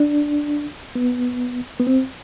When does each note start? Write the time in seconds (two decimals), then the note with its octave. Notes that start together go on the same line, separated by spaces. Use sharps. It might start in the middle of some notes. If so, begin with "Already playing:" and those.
Already playing: D4
0.95 B3
1.80 B3
1.87 C4